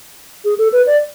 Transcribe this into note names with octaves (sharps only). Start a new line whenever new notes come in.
G#4
A4
B4
D5